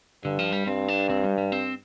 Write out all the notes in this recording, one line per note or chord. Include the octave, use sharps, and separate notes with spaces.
G2 D3
F3
G3
G2 C4
D4
C4
G3
G3
C4